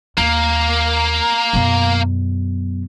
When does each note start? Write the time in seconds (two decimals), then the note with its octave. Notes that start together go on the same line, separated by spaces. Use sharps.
0.18 D#2 A#3
1.53 F#2 B2